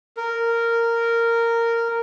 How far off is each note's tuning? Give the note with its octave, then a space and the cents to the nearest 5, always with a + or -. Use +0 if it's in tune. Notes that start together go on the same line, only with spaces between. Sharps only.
A#4 -10